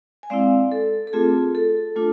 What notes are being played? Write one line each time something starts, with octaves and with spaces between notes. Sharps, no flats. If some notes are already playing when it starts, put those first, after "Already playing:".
G#5
G#3 C4 E4 D5 F5
A4
A4
A3 C4 F4 G#4
A4
A3 D4 F4